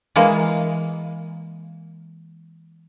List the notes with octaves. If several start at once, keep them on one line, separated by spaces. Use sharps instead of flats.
E3 G#3 A#3